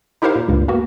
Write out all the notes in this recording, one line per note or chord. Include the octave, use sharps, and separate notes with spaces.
D#4 E4 G4 A#4 C5 F5
A#2
C#2 G2 A#2
A#3 B3 F#4